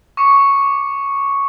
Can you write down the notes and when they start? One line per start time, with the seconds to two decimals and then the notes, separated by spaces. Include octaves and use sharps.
0.17 C#6 D6 C#7